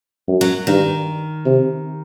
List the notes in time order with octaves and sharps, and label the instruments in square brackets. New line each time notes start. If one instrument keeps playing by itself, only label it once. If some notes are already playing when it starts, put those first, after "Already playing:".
[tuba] F#2
[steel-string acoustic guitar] F#3
[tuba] G2 [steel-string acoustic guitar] D#3
[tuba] C3